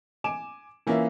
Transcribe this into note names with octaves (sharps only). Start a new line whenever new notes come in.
G#5 D6 D7 E7
E3 A#3 C#4 F4 E5